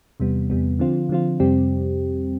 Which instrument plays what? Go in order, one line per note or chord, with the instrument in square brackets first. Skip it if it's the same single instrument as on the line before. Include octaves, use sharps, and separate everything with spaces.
[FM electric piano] E2 C3 G3 B3
E2 C3 G3 B3
D3 F3 C4 F4
D3 F3 C4 F4
F2 C3 G3 C4 G4